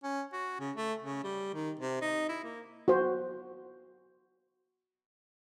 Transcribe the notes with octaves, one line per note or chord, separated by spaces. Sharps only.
C#4
F#4
C#3
A3
C#3
G3
D#3
C3
D#4
E4
A#3
F#4 C5